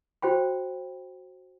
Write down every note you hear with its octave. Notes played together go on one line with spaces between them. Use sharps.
F#4 C5 G5 B5